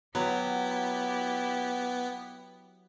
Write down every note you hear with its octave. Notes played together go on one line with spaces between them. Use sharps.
F#3 B3 E4 G4